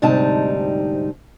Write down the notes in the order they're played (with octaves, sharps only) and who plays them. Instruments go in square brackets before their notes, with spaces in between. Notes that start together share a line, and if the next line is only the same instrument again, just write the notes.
[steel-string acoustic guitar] D2 G#2 C3 G3 D#4 A5